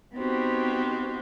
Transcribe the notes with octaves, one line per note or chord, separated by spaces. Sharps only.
B3 C4 D#4 F#4 G4 C5